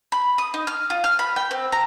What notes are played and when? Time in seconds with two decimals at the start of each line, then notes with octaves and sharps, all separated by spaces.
0.12 B5
0.38 D#6
0.54 D#4
0.67 F6
0.90 F4
1.04 F6
1.19 B5
1.36 G5
1.51 C4
1.72 A#5